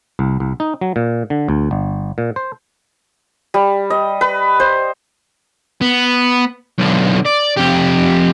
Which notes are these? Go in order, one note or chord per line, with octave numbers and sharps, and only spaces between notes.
C2
C2
D#4
F#3
A#2
D3
D2
G1
A#2
C5
G3
D#5
B4
C5
B3
B1 D3
D5
F2 G4